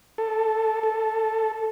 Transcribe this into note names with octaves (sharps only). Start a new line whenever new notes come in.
A4
A4